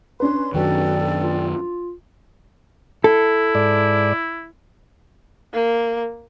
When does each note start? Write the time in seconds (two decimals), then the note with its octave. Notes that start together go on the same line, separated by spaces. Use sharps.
0.20 C#4 D4 B4 C6
0.54 F#2 D#3 F#4 A4 D5 G5
1.22 F4
3.04 E4 A4
3.55 G#2 D5
5.53 A#3